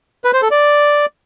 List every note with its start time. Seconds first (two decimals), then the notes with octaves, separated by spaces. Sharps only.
0.24 B4
0.33 C5
0.42 A4
0.51 D5